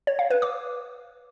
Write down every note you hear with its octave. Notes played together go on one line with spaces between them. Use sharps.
C#5
F5
B4
D6